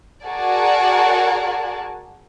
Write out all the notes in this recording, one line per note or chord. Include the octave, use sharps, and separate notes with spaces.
F#4 G#4 A#4 D5 A5